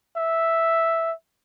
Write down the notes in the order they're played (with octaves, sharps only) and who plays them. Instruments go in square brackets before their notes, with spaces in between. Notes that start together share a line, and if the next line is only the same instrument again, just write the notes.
[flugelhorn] E5